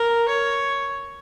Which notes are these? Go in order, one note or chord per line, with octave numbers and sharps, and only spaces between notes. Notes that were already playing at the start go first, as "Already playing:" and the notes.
Already playing: A#4
C#5